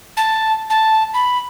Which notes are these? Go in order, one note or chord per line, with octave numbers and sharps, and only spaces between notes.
A5
A5
B5